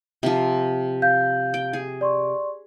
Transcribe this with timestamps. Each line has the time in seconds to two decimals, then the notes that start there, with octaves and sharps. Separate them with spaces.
0.23 C3 F3
1.02 F5 G6
1.54 G5
1.73 G#4
2.01 D5 C6 C#6